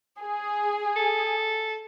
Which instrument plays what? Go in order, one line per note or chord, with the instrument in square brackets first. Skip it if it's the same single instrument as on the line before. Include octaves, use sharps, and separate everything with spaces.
[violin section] G#4
[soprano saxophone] A4